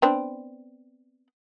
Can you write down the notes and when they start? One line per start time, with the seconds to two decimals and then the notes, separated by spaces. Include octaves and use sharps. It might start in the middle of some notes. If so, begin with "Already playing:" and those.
0.02 B3 C4 D4